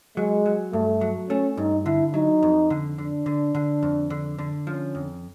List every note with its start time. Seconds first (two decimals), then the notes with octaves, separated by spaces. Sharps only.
0.17 F#3 G#3
0.46 F#3
0.73 G2 A3
1.01 F#3
1.30 A3 C#4
1.57 G2 D#4
1.85 D3 E4
2.14 F#3 D#4
2.43 F2
2.70 D3
2.98 D3 D4
3.26 D3
3.55 D3
3.83 F2
4.10 D3
4.38 D3
4.66 F3 C#4
4.95 F2